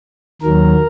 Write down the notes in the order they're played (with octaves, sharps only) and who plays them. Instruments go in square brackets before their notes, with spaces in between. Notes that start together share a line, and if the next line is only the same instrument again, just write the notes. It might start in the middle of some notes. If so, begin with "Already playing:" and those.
[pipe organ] D#2 D#3 F#3 A#4